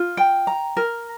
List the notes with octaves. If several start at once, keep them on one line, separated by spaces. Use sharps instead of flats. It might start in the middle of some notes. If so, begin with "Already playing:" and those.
Already playing: F4
G5
A#5
A#4